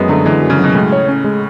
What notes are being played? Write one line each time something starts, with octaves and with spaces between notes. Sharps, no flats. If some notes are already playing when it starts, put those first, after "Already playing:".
Already playing: F#2 G#3 B3
D3 F#3 A3
D3 E3 G#3
F#2
C#3 E3
B2 F#3
A2 C#3 G#3
C#5
C#4
G#3